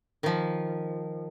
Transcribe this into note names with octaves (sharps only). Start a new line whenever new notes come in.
D#3 F3